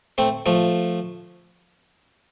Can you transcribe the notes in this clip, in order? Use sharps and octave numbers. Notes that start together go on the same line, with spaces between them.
A3 C4
F3 A3